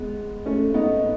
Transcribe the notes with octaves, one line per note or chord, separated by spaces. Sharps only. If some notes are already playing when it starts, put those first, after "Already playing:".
Already playing: G#3 B3
A3 C#4
B3 D#4